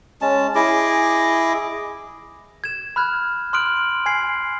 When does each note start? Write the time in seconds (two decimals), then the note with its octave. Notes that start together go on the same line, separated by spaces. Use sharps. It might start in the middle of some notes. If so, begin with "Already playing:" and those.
0.22 G#3 C#4 A5
0.55 E4 G#4 D#5 D6
2.64 G#6 E7
2.96 B5 F6 F#6 G#6
3.53 C6 D#6 F6 F#6 D7 F#7
4.06 G#5 G#6 C7